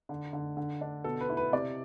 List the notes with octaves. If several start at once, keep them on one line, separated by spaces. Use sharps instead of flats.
D3
D3
D3
D4
B2 A4
B4
E4
B4
C3 D5